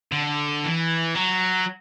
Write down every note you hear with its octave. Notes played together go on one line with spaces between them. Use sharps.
D3
E3
F#3